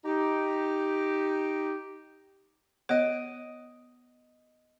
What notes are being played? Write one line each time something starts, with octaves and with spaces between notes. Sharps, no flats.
D#4 G4
B3 C#5 D#5 D7